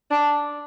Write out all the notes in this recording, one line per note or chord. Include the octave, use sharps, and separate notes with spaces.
D4